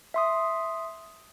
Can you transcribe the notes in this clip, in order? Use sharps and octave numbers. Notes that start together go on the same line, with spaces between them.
E5 C6 D#6